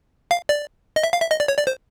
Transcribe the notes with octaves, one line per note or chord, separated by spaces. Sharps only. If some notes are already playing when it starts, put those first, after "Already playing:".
F5
D5
D#5
E5
F5
E5
D#5
D5
C#5
D5
C5